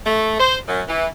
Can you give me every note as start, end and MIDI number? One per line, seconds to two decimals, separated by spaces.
0.05 0.36 57
0.39 0.56 72
0.67 0.80 42
0.87 1.06 52